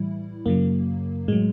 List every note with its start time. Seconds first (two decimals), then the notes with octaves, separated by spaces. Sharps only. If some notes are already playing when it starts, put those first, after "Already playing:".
Already playing: A2 E3 G3 E4
0.46 F#2 C#3 F#3 A#3
1.28 A2 F#3 G#3